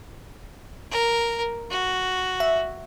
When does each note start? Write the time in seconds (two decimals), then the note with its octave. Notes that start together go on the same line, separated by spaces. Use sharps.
0.91 A#4
1.71 F#4
2.40 E5